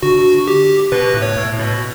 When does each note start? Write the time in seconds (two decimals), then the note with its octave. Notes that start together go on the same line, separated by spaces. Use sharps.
0.03 D3 F#4
0.48 G4
0.92 B2 B4
1.14 A2
1.22 C#5
1.36 A2
1.59 B2